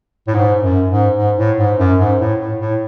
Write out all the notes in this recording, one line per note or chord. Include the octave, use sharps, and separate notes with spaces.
A2
G#2
F#2
G#2
G#2
A2
G#2
F#2
G#2
A2
A2
A2